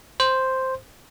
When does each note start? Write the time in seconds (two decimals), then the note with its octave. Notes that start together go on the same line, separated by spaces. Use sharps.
0.20 C5